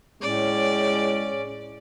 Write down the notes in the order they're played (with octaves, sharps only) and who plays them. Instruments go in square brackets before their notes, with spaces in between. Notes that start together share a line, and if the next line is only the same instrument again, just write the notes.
[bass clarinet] A2 [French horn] G#3 [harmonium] C#4 [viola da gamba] D5